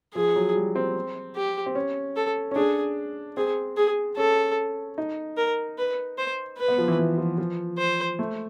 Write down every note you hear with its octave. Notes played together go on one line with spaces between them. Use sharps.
F3 G#4
F#3
G3
C4
G4
C4
C#4
A4
C#4
D4 G#4
C4 G#4
G#4
C#4 A4
D#4
A#4
B4
C5
B4
B3
F3
E3
E3
F3
F3
C5
A3